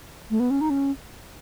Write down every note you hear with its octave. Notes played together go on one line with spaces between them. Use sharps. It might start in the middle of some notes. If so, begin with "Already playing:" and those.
A3
B3
C#4
D#4
C#4